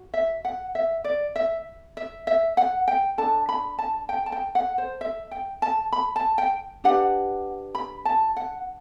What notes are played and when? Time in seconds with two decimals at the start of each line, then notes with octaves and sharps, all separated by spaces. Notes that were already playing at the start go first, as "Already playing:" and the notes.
Already playing: F#4
0.14 E5
0.45 F#5
0.75 E5
1.04 D5
1.36 E5
1.97 E5
2.27 E5
2.57 F#5
2.88 G5
3.18 D4 A4 A5
3.49 B5
3.79 A5
4.09 G5
4.26 A5
4.32 G5
4.55 F#5
4.78 C5
5.01 E5
5.31 G5
5.62 A5
5.92 B5
6.16 A5
6.38 G5
6.84 D4 G4 B4 F#5
7.75 B5
8.05 A5
8.37 F#5